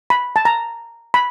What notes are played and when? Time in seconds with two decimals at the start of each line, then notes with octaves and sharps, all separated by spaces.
0.10 B5
0.36 A5
0.45 A#5
1.14 B5